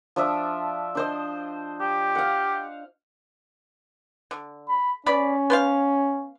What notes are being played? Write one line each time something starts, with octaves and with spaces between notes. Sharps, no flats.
F3 D4 E5
D4 C5 D#5
G4
F5 F#5
D3
B5
B3 C#4 D5 B5
B3 C5 F5